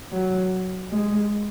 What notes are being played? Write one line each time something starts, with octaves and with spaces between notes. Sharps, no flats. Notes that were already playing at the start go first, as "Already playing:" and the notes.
F#3
G#3